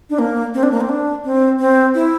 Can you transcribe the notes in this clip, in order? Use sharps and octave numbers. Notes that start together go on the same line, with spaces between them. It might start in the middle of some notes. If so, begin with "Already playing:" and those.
D4
A#3
C4
D4
A#3
C4
D4
C4
C4
E4